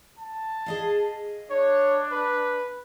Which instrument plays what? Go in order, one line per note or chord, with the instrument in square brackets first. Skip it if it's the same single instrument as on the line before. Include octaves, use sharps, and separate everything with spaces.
[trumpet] A5
[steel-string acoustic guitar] G#4 D#5 F5
[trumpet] D4 [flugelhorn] C#5
[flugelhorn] B4